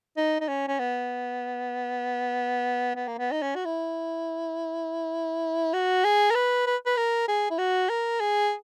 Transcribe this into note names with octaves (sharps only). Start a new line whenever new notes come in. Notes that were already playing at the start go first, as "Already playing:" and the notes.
D#4
D#4
C#4
C#4
B3
B3
A#3
B3
D#4
C#4
F#4
E4
F#4
G#4
A#4
B4
B4
B4
A#4
G#4
E4
F#4
A#4
G#4